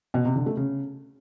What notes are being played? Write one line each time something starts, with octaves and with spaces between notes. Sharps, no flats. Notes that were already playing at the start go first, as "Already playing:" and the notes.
B2
C3
D3
A3
C#3